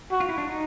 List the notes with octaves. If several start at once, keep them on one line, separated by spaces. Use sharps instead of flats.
F#4
F4
E4
D4
D#4